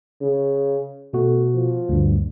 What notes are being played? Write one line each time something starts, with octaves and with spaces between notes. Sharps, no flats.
C#3
B2 A3 F#4
F3
D2 G2